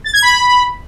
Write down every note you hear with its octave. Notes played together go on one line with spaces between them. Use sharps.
A6
G#6
B5